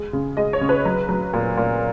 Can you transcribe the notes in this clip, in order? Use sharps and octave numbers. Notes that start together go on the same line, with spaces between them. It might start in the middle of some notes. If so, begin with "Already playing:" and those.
Already playing: G#3
C#3
G#3 D#5
C#5
C#3
B4
F#3
F#3
A#2
A#2